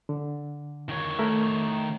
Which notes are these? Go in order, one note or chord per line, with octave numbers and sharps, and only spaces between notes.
D3
D#3 C#5
A3 A#4 E5